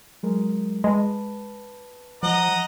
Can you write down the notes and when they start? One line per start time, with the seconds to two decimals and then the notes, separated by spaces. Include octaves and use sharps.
0.23 F#3 G#3 A#4
0.84 G#3 B4 A5
2.23 F3 D#5 F#5 A#5